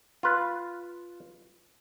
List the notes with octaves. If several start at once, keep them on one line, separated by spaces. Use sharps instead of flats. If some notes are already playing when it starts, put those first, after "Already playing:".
F4 B4